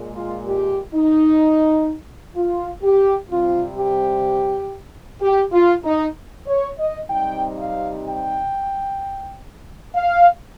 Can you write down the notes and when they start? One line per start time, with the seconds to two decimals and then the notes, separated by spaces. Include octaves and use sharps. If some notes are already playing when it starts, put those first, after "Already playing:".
Already playing: A#2 G#3
0.15 F4
0.46 G4
0.94 D#4
2.36 F4
2.83 G4
3.30 C3 G3 C4 F4
3.78 G4
5.21 G4
5.52 F4
5.84 D#4
6.47 C#5
6.78 D#5
7.10 C3 G3 C4 D#4 G5
7.59 F5
8.05 G5
9.96 F5